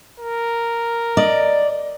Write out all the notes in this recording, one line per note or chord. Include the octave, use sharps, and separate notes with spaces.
A#4
D5 D#5